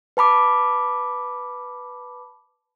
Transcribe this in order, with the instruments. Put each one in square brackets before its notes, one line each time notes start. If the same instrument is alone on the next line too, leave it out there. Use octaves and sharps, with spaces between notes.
[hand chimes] B4 A5 B5 D6